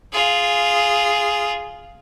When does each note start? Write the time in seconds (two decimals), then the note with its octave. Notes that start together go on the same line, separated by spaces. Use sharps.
0.12 F4 G#4